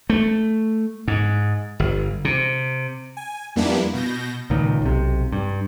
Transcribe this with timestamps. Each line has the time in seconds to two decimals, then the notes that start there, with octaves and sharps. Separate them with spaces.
0.10 A3
1.08 G#2
1.80 G1
2.25 C3
3.17 G#5
3.56 F2 G3 A#3 B3 D4 E4
3.94 B2 G6 A#6
4.50 C#2 A#2 D#3
4.82 B1 C3
5.32 G2